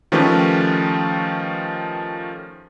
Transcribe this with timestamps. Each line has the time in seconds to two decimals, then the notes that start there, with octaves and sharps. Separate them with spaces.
0.12 D#3 F3 A3 C#4 G4 B4